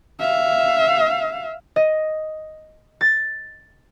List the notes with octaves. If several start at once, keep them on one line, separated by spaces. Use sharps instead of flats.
E5 F5
D#5
A6